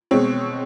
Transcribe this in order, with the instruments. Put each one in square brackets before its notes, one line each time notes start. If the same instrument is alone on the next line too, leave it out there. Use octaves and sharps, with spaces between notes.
[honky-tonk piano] B2 G#3 C4 C#5